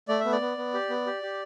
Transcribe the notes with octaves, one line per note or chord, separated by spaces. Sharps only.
A3 D5
B3 E5
D5
B3
B3
G4
B3
G4
G4